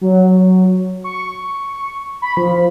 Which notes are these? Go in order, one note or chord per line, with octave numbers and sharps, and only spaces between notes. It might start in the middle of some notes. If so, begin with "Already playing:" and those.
F#3
C#6
B5
F3